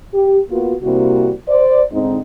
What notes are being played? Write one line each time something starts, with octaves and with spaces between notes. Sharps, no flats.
G4
A#3 B3 F4 F#4
C3 G3 A#3 C4 E4 F#4
C5 D5
G#2 D3 C4 D#4